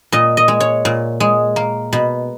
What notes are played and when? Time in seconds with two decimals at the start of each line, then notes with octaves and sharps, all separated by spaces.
0.12 A#2 D#5
0.37 D#5
0.48 G#3
0.60 C#5
0.85 A#2
1.20 G#3
1.56 A#3
1.93 B2